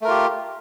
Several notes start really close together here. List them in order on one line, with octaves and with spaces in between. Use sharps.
A3 A#4 F4 G4